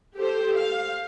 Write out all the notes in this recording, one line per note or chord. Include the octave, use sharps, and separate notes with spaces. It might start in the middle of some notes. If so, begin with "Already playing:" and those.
G4 A4 C5
F5